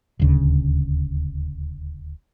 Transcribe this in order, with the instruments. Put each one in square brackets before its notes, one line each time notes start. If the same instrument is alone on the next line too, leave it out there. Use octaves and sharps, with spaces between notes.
[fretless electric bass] D#1 D2 C#3